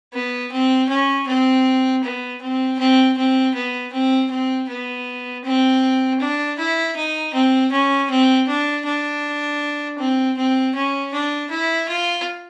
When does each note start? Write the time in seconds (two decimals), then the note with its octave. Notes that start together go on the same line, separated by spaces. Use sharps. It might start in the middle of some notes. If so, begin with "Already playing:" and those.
0.13 B3
0.51 C4
0.89 C#4
1.27 C4
2.03 B3
2.41 C4
2.79 C4
3.17 C4
3.54 B3
3.92 C4
4.30 C4
4.69 B3
5.44 C4
6.20 D4
6.58 E4
6.96 D#4
7.34 C4
7.71 C#4
8.10 C4
8.48 D4
8.85 D4
9.98 C4
10.37 C4
10.75 C#4
11.13 D4
11.50 E4
11.88 F4